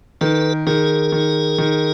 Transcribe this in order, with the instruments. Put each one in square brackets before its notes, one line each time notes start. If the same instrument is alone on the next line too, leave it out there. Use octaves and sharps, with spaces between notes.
[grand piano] D#3 [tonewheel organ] A4 B4
[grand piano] D#3 [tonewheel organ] G#4 A#4
[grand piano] D#3
D#3